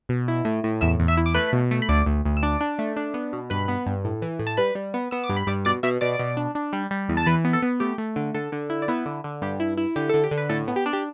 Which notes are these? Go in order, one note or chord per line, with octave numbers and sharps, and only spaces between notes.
B2
E4
A2
A2
E2 E5 E6
E2
E5 E6
E4
D6
A3 B4 B5
B2
A3
B5
D2 D5 D6
D2
D2
E6
D4 D5 D6
D4
A3
D4
B3
B2
G2 B4 B5
B3
G2
A2
E3
A2
A5
G3 B4 B5
G3
B3
B3 E6
D6
G2
B5
G2 D5 D6
B2 D5 D6
B2 E5 E6
B2 D5 D6
B2
D4
D4
G3
G3
E2
A5
E3 B4 B5
B3
A4
B3
A3 G4
A3
D3
D3 A4
D3
E4
D5
B3 E4 B4
D3
D3
G2 G4
E4
E4
D3 G4
D3 A4
G4
D3
B4
A2 A4
B3
G4
D4
G4